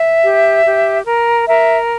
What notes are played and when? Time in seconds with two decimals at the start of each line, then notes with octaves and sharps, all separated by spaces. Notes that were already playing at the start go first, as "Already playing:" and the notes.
Already playing: E5
0.23 G4
0.65 G4
1.06 A#4
1.48 A#4 E5